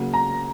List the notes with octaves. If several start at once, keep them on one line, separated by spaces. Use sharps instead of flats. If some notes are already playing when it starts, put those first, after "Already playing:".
Already playing: C#3 F#3 A#3
A#5